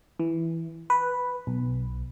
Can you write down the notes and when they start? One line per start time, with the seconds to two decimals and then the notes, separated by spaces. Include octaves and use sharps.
0.19 E3
0.90 B4
1.47 B1